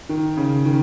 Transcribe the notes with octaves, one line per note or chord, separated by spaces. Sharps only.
D#3
C#3
D#3